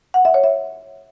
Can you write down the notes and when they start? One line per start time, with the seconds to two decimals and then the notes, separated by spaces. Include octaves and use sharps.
0.14 F#5
0.25 E5
0.34 C#5
0.44 E5